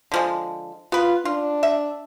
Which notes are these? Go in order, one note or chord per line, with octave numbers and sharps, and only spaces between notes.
D3 F3 G#3
B3 F4 B4
D4 F4
E5